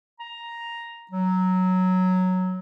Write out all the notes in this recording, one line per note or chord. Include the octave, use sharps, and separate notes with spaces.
A#5
F#3